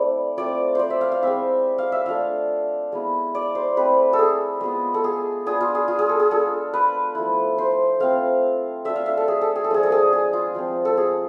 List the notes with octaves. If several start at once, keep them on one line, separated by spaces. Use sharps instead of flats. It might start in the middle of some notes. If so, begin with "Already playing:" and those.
Already playing: A3 C4 E4 D5
A3 C4 F4 D5
C5 D5
E5
F5
F5
G#3 C4 E4 E5
F5
E5
A3 D4 F4 F5
G#3 B3 E4
D5
C5
A3 C4 E4 B4
A4
G#4
G#3 B3 F4
A4
G#4
B3 D4 F4 G#4
F4
G#4
F4
G#4
A4
G#4
G#3 D4 F4 A4
B4
F3 A3 E4
C5
A3 C4 F4 F5
A3 D4 F4 E5
F5
E5
A4
G#4
A4
G#4
A4
F3 G#3 D4 F4 G#4
A4
G#4
G#4
F4
F3 G#3 C4
A4
G#4